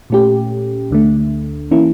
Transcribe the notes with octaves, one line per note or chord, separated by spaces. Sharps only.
A#2 A3 C#4 G4
D2 D3 A3
E3 A#3 C#4 E4